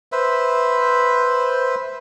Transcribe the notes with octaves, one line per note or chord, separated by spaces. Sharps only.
B4 C5 E5